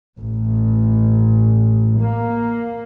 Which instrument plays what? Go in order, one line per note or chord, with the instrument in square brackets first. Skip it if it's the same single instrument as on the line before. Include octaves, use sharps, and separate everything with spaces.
[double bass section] A1
A#3